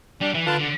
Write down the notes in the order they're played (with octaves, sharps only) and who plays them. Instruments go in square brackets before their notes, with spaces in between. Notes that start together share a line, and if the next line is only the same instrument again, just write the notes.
[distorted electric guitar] G3 [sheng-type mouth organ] D4
[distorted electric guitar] E3
[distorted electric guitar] D3 [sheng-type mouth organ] F4 B4 F5 A5
[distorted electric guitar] D3